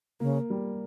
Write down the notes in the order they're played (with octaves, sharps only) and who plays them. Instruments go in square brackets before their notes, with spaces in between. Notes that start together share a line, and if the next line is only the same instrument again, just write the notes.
[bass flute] C#3 [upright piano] A#3
[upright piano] G3